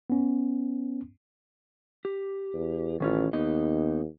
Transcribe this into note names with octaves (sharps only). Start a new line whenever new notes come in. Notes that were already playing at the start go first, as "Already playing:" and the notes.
B3 C#4
G4
E2
A1 D#3 C#4 F4
D#2 B3 D#4 D#5